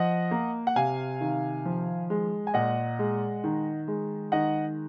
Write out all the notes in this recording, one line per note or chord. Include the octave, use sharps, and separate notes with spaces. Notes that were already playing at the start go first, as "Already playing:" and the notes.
Already playing: F3 D#5 F#5
A#3
F#5
C3 F5 G#5
D#3
F3
G#3
G#5
A#2 D#5 F#5
G#3
D#3
G#3
D#3 D#5 F#5